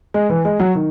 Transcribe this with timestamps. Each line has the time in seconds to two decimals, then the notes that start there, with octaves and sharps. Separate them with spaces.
0.14 G#3
0.30 E3
0.45 G#3
0.60 F#3
0.75 D#3